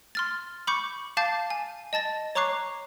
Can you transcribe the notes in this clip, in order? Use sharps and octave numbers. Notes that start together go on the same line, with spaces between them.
C6 F6 A6
B5 C#6 D6 G6 C#7
F5 A5 D6 G6 A6 C7
G#5
D#5 A5 A6 A#6
C#5 A#5 C#6 D6 F#6 C7